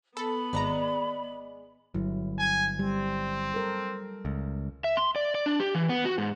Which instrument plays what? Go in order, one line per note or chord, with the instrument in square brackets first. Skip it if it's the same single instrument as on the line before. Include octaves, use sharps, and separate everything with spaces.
[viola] B3 [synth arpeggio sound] A4 [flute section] B5
[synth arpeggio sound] G#1 A#5 [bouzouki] G#3 B4 D5
[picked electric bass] G1 [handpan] F#3 E4
[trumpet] G#5
[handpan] G3 [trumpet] C4
[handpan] A4 A#4
[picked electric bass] C#2
[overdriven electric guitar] E5
C6
D5
D5
D4
G4
E3
B3
F#4
G#2